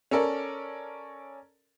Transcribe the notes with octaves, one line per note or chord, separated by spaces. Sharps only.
C#4 A4 A#4 D5